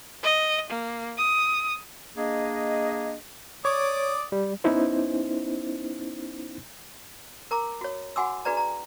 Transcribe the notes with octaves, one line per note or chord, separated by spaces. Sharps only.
D#5
A#3
D#6
A#3 D4 G#4 D#5
C#5 D5 D6 D#6
G3
B3 C#4 D#4 E4 C5
A#4 A#5 D6
F#4 C#5
F#4 F#5 G#5 C6 D6 E6
D4 F#4 G#4 B4 D5 A#5
A#5